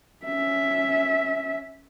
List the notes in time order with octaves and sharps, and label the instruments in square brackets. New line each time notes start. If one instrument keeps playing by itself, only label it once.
[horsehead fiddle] C#4 E5